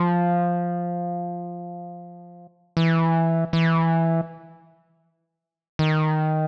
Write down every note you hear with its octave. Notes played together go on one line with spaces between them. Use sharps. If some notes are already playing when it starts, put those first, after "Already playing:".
Already playing: F3
E3
E3
D#3